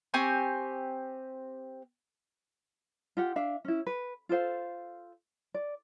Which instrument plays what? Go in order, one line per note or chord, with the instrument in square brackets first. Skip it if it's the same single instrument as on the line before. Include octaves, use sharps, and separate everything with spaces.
[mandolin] C4 G4 G#5 C#6
[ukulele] F4 G4 F#5
D4 E5 F5
C#4 E4
B4
F4 A4 C5 F5
D5